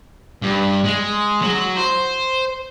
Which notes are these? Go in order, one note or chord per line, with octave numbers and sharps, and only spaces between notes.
G2
G#3
F#3
C5